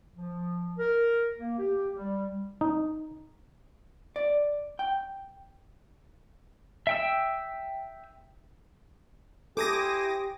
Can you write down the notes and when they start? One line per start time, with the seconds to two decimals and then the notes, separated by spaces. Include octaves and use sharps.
0.15 F3
0.78 A#4
1.38 A#3
1.58 G4
1.96 G3
2.61 D#4
4.16 D5
4.79 G5
6.87 E5 G5 E6
9.57 E4 G4 A4 C5 G#5 D6 D#6 A#6